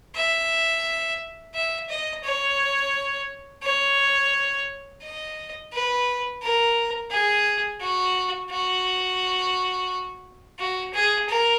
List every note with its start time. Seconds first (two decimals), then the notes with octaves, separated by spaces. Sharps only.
0.15 E5
1.54 E5
1.89 D#5
2.24 C#5
3.63 C#5
5.02 D#5
5.72 B4
6.42 A#4
7.10 G#4
7.81 F#4
8.50 F#4
10.59 F#4
10.93 G#4
11.29 A#4